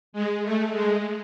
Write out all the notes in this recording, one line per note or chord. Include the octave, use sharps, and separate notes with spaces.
G#3
A3
G#3